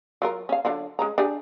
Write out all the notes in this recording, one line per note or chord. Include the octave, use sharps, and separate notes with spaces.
F#3 F4 A#4
C#4 F5
D3 F#3 F4
G#3 C#4 A#5
D4 G4 G#4